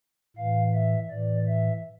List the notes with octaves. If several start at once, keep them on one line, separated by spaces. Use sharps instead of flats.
A2 E3 F5
E5
A2 E3 D5
E5